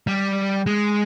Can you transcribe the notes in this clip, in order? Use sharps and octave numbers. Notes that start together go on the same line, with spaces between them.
G3
G#3